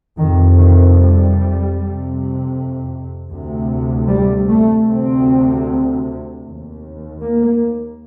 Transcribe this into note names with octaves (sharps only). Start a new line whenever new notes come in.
F2 C3 D#3
D#3
G3
F2 C3
D2 C3
G3
A3
D2 C3 C4
D#2
A#3